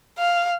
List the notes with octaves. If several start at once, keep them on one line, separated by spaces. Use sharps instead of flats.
F5